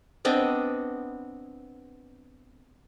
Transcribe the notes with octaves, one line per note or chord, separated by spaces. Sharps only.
B3 C4 D4 D#5